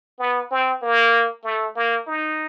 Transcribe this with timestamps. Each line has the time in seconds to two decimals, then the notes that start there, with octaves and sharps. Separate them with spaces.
0.19 B3
0.51 C4
0.83 A#3
1.44 A3
1.76 A#3
2.07 D#4